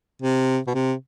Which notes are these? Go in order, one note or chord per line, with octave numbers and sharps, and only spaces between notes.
C3
B2
C3